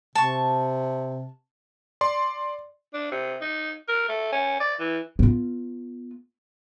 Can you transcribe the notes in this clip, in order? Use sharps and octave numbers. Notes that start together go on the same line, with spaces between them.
C3 A5 C#6
D5 C6
D4
C3
D#4
A#4
A3
C#4
D5
E3
B3 F4